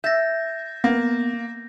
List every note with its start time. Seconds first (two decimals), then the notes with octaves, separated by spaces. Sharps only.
0.04 E5 G6 A6 A#6
0.84 A#3 B3 A#6